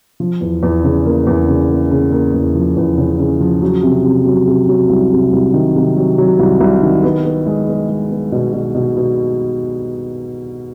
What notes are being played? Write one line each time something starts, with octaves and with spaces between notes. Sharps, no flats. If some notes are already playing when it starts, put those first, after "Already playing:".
F3
E2
E2
C#3
A#3
E2
C#3
A#3
C#3
A#3
E2
F3
E2
C#3
C#3
F3
F#3
C3
C3
F#3
C3
F#3
C2
C3
C2
D#3
C3
F#3
F#3
C2
C2
D#3
B3
B3
G#3
B3
G#3
B3
B2
B2
B2
B2